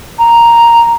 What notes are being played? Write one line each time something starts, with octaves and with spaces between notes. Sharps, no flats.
A#5